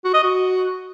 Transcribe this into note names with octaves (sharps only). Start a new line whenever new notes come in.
F#4
D#5
F#4